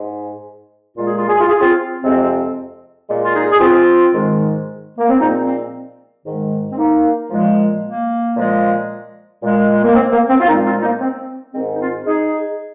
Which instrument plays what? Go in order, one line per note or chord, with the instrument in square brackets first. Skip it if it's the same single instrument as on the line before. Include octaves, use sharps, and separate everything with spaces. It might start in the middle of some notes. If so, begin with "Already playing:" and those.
Already playing: [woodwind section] G#2 G#3
A#2 G#3 F4
G#4
F4
G#4
F4
G#4
C4 F4
F2 C3 G#3 C4
A#2 G#3
F4
D#4 G#4
G#4
C4 F4
G#2 D#3 G#3
A#3
C4
A#2 F3 G#3 A#3 D#4
C4
G#2 D#3 G#3
C4
A#3 D#4
A#2 F3 G#3
A#3
A#2 F3 G#3
A#2 G#3
A#3
C4
A#3
C4
F4
A#2 F3 G#3 A#3 D#4
C4 F4
A#3 D#4
C4
G#2 D#3 G#3 C4
D#4
C4 F4
D#4 G#4